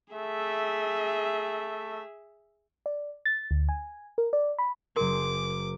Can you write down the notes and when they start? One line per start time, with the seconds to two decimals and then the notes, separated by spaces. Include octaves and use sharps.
0.14 A3 G#4 E5
2.86 D5
3.25 A6
3.51 D2
3.69 G#5
4.18 A#4
4.33 D5
4.59 B5
4.96 F#1 G#4 A#4 C6 D6